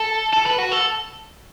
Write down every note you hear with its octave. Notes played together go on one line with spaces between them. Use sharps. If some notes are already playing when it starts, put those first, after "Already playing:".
Already playing: A4
A4
B4
F#4
A4